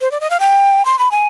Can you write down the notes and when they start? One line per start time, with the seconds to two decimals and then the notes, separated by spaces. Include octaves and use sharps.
0.01 C5
0.11 D5
0.20 D#5
0.30 F5
0.40 G5
0.85 C6
0.99 B5
1.11 G#5